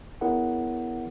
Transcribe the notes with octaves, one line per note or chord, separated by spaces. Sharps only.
B3 E4 G#4 A#4 C#5 F#5